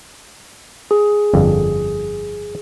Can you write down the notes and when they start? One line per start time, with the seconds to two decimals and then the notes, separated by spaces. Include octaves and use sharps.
0.91 G#4
1.33 G1 F2 D3